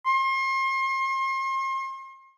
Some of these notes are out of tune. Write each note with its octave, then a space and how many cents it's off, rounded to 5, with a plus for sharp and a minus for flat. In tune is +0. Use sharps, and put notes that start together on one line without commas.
C6 +40